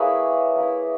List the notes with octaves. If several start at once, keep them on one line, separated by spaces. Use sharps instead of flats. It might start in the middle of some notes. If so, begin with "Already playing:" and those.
Already playing: A#3 E4 G#4 B4 C#5
A#3 E4